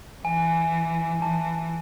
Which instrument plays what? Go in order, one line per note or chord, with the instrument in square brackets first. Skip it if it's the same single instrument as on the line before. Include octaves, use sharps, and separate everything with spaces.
[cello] E3 [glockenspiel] G#5
[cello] E3 [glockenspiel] A5